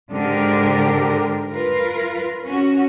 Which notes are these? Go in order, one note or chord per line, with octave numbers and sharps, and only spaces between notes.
G#2 D3 G4 A#4
F4 A#4 B4
C#4 F#4